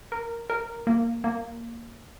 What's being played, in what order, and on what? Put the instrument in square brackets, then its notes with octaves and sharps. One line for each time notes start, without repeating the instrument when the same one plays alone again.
[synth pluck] A#4
A#4
A#3
A#3